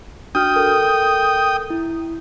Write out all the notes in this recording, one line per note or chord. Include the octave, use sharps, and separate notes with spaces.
D4 F#4 G5 D#6 F6
A4 A#4
E4